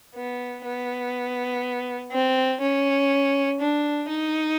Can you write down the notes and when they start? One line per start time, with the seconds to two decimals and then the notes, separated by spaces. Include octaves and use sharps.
0.15 B3
0.65 B3
2.12 C4
2.61 C#4
3.60 D4
4.09 D#4